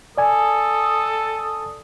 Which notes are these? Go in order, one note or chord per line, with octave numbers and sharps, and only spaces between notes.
A4 D5 G#5 D#6